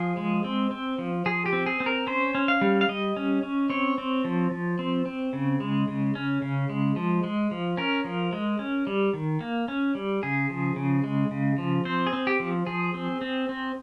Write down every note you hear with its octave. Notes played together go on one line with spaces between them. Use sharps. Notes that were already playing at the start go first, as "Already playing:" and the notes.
Already playing: F3 G#4
G#3
C4
C4
F3
F3 G#4
G4
C4
G#4
C4
A#4
C#4 C5
C#4
F5
G3
F5
G3 D#5
C#4
C#4
C4 C#5
C4
F3
F3
C4
C4
C#3
G#3
C#3
C#4
C#3
G#3
F3
G#3
F3
C#4 A#4
F3
G#3
C#4
G3
D#3
A#3
C#4
G3
C#3 G#4
F3
C#3
G#3
C#3
F3
C4 C5
G#4
C4
G4
F3
F3 G#4
C4
C4
C4